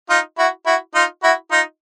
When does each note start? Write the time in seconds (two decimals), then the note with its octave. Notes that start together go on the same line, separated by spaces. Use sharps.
0.10 D#4 F4
0.38 E4 F#4
0.66 E4 F#4
0.95 D#4 F4
1.23 E4 F#4
1.52 D#4 F4